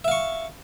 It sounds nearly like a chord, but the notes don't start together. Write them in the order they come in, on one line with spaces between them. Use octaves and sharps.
E5 F5 C#6